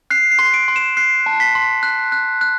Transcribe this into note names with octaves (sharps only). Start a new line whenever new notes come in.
F#6 C7
C7
C6
D7
C6
E7
F#6 C7
A5
B6
C6
F#6
F#6
F#6